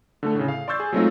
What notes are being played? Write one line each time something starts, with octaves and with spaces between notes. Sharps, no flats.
D3 A3 A4
A2 C#3
F5
D5 C6 C#6 E6 G6 A6
G#4
F#3 G#3 A3 C4 D#4 F4